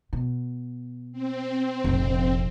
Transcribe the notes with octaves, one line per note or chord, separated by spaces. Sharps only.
B2
C4
F1 A#1